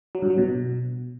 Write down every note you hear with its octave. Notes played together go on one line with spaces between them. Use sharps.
F#3
G2
F#3
B2